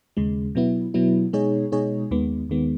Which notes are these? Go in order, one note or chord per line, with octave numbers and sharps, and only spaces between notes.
D#2 C#3 G#3
B2 F#3 B3 E4
B2 F#3 B3 E4
B2 G#3 D#4 G#4 C#5
B2 G#3 D#4 G#4 C#5
D#2 D#3 G#3 B3
D#2 D#3 G#3 B3